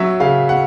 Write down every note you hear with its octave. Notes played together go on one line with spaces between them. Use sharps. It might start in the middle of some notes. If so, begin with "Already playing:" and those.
Already playing: F#3 C#4 E5
C#3 F5
F#5